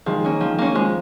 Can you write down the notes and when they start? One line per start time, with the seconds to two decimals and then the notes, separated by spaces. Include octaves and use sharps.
0.06 D#3 F3 G#3
0.25 A#3 C#4
0.41 D#3 F3
0.59 A#3 C#4
0.75 F3 G#3